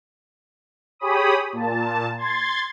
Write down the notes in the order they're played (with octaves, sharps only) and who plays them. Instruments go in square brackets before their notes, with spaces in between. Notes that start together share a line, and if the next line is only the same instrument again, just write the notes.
[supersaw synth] G4 G#4 C#5 B5 D#6
A#2 A5
C6 G#6 A6